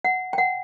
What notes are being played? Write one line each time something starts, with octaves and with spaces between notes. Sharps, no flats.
F#5
G5
F#5